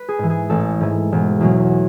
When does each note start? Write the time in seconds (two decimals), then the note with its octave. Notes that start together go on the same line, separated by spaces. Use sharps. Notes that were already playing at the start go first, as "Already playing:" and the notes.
Already playing: B4
0.08 G#4
0.19 G#2 E3
0.30 G#4
0.50 A1 A4
0.80 G#2 E3
1.12 E1
1.40 E2 B2 F#3